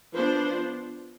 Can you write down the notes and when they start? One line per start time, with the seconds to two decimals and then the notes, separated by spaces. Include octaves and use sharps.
0.14 F3 B3 D4 C5